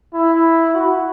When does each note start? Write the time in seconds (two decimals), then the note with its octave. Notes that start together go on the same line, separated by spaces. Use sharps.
0.14 E4
0.75 F#4